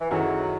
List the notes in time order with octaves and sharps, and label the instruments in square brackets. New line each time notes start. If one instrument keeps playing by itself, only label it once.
[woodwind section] E3
[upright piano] F#2 D#3 A3 E4 G#4 [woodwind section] F#3